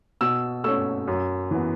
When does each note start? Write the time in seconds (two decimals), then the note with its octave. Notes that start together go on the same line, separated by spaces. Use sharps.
0.21 B2 E6
0.64 A3 C#4 E6
1.08 F#2
1.51 E3 B3